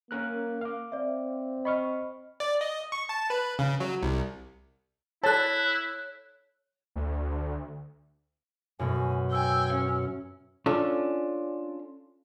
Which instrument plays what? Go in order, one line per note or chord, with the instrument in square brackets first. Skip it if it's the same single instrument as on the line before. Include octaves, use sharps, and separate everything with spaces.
[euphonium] A#3 [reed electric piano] C#4 A#4 F#6
[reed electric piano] F5 D6
[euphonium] C4 [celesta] D5 E5
[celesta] D#5 [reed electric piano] B5 C#6 F6
[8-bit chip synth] D5
D#5
C#6
A5
B4
C#3
F#3
C2
[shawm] E4 [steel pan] A4 A5 [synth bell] C#5 F#6
[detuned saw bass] D2
[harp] F#2 B2 A3 [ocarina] G#5
[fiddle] G5 G#5 [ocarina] E6
[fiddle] C#4
[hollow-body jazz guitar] C#4 D4 F4 A4